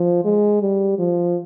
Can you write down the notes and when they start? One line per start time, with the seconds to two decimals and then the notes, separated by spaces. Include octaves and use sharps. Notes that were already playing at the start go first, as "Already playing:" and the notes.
Already playing: F3
0.25 G#3
0.62 G3
0.99 F3